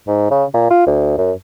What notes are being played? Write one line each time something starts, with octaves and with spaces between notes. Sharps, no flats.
G#2
C#3
A#2
F4
D2
F#2